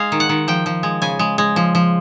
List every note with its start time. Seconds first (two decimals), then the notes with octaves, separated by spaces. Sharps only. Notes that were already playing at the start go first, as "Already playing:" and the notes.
Already playing: G#3 F5
0.12 D#3
0.20 F#5
0.29 D#3
0.48 F3 G5
0.66 F3
0.83 G#3
1.02 C#3 G#5
1.19 G#3
1.38 G#3
1.56 F3
1.75 F3